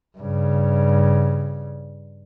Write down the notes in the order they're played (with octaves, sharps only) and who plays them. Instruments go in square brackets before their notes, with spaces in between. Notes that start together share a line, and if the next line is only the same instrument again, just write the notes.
[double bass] G2 C#3